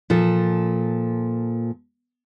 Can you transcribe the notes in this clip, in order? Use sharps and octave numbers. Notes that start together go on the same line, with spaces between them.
A#2 F3 A4